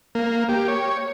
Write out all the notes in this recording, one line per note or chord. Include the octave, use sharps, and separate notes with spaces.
A#3
G4
C#5